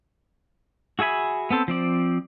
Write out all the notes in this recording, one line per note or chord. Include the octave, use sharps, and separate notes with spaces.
F#4 G#4 E5 G#5 B5
B3 C4 A4 C5
F3 C4 D5